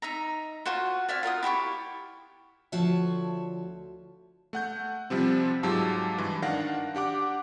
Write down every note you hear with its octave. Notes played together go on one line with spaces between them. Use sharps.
D#4 E5 A#5
F4 F#4 C5 F#5
D5 E5 F5 G#5
F4 A#4 F#5 D#6
E4 G4 B5 C#6
D2 F3 F#4 C#5 E5 A5
A3 F#5 G6
C3 F3 G3 C4
G#2 F#3 F4 G4 A5 E6
G2 E3
D#3 D4 F5 F#5 A#6
D4 G4 F#5 D6